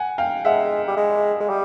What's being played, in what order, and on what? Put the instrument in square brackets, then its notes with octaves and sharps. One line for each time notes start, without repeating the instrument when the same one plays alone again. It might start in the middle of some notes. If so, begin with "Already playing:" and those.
Already playing: [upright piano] F#5 G#5
F5 G5
[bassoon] G#3 [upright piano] E5 F#5
[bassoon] G3
G#3
G#3
G3